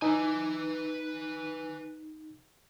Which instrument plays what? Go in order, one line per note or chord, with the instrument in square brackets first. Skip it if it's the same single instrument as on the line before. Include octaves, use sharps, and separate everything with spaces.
[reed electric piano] D#4 [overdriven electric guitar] B4 G#5